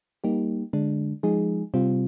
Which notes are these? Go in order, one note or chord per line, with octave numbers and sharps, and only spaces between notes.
G3 A#3 D#4 G4
D3 G#3 D4
F3 G#3 D#4 G#4
C3 G3 C4 F4